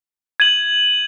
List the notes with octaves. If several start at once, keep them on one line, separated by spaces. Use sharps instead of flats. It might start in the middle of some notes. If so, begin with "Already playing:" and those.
G#6 D#7 F#7